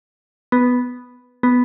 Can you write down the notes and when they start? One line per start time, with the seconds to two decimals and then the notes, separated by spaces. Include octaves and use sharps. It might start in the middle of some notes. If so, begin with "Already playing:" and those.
0.52 B3
1.43 B3